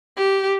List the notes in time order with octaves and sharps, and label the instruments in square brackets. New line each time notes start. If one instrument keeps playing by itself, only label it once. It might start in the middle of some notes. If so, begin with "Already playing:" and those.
[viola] G4